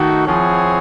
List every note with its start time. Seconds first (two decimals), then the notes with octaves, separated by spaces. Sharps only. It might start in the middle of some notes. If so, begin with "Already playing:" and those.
Already playing: D#3 A3 D#4 F#4 A4
0.27 F3 C4 E4 G#4 C#5 F#5